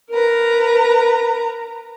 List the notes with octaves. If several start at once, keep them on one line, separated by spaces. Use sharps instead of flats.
A#4 B4 A#5